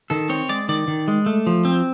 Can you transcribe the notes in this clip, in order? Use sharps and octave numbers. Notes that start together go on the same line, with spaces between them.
D#3 A4
C4 C#5
G#3 D5
D#3 D5
D#3
G#3
A3
F3
C4